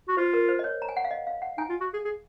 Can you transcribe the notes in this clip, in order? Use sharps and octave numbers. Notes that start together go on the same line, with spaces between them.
F#4
F4 C5
A#4
C5
D#5
C#5
A#5
G#5
F#5
F5
D#5
F5
F#5
D#4 G#5
F4
F#4
G#4
G#4